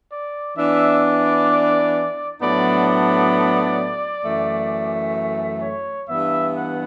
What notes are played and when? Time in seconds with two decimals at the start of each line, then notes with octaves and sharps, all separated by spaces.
0.11 D5
0.56 E3 B3 D4 E5
1.03 D5
2.40 A2 F#3 B3 D4 D5
2.86 D5
4.24 F#2 E3 A3
5.62 C#5
6.07 G2 E3 B3 E5
6.53 F#5